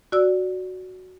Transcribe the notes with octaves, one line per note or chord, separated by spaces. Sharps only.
F#4 D5 E6